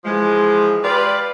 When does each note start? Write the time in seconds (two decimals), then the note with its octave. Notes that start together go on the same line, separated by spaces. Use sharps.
0.05 E3 F3 G#3
0.82 F4 G4 B4 D5